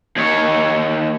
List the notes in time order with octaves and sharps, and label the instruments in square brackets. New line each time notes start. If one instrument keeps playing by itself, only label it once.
[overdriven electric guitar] D#2 C#5